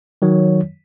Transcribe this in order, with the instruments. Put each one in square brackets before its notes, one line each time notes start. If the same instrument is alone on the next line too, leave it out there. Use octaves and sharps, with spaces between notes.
[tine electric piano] D#3 F#3 C#5